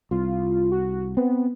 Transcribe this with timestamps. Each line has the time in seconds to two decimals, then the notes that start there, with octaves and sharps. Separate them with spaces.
0.11 C2 F4
0.72 F#4
1.17 B3 C4